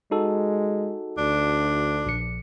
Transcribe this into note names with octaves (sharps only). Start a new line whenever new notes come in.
G#3 D#4 F#4 A4
D2 D4
A#1 C#7